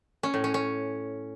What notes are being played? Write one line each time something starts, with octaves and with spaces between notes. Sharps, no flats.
C#4
A2
C#4
C#4